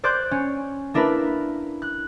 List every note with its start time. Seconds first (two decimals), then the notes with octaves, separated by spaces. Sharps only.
0.04 C5 D5 C6 F#6 G6
0.31 C#4
0.94 A#3 D4 E4 A#4 B4
1.82 F#6